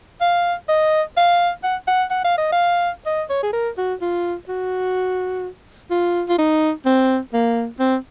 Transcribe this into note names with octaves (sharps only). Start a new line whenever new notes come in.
F5
D#5
F5
F#5
F#5
F#5
F5
D#5
F5
D#5
C#5
G#4
A#4
F#4
F4
F#4
F4
F4
D#4
C4
A#3
C4